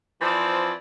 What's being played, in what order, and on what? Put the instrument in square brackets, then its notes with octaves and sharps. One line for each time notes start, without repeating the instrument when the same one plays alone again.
[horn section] E3 F3 C4 C5 D5